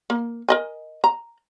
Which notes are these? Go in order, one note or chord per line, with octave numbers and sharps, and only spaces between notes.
A#3
A#4 D#5 G#5
A#5